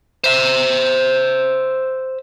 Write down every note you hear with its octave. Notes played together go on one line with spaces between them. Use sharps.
C5 E5